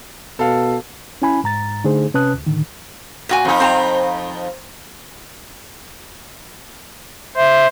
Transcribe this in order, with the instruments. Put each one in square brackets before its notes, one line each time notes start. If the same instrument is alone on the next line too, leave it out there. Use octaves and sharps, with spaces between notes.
[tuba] B2 [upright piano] A4 F5
[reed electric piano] C#4 E4 G#5 B5
G#2 A#5 A6
D3 A3 D#4 G#4 C5
C3 C#4 B4 A5 D#6 F#6
D2
A2 D3 D#3
[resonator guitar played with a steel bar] A#2 F#4 G#5
[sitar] F2 D#4
[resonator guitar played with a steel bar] C4 A5 A#5
[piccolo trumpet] C5 [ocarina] E5